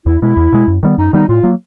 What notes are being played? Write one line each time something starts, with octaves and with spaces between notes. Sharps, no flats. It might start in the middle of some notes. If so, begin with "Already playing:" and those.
E2 E4
B2 G#3 E4
E2
B2 G#3
F#2
D#3 G3 B3
F#2 D#4
D#3 G3 B3 D#4
A2 F4
F#3 A#3